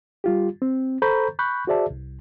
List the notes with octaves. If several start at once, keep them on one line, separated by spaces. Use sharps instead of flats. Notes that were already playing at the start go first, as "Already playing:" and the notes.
G3 F4 G4
C4
A4 C5 A#5 B5 C#6 G6
B5 C#6 F#6 G6
F#4 G#4 C5 D5 E5 A5
C2